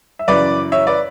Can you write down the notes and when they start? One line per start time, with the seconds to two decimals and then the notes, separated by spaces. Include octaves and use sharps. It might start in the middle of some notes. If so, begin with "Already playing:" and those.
0.19 E5
0.28 F#2 C#3 E3 B4 D5
0.72 C#5 E5
0.87 B4 D5